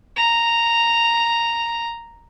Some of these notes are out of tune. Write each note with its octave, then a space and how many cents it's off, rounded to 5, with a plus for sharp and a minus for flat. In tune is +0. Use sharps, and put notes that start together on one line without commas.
A#5 -5